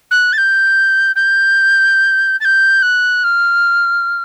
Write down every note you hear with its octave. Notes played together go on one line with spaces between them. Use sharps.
F#6
A6
G6
G6
A6
G6
F#6
F6